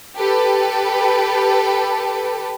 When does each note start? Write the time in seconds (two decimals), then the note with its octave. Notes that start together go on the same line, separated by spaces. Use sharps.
0.16 G4 A4 B4